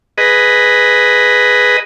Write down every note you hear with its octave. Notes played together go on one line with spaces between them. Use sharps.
G#4 B4 D#5